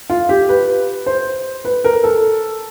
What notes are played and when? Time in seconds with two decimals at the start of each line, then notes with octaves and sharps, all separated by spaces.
0.10 F4
0.29 G4
0.49 B4
1.06 C5
1.65 B4
1.84 A#4
2.04 A4